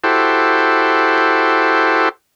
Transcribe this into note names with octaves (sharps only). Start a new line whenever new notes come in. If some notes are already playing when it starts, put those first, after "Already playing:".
E4 F#4 G4 A4 C5